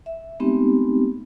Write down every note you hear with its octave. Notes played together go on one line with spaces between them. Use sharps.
E5
G#3 A3 B3 C4 D#4 G4